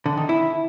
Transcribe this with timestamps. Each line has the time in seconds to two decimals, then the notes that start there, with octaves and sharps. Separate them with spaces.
0.06 D3
0.17 D#3
0.29 E4